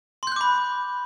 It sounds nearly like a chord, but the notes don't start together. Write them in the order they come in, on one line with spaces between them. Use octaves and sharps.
C6 G6 F#6 D6 B5